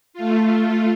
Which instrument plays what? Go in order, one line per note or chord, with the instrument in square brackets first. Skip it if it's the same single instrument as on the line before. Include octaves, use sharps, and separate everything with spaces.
[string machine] A3 F4